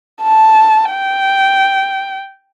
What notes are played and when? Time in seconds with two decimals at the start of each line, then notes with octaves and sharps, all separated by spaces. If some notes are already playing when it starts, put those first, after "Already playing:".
0.23 A5
0.91 G5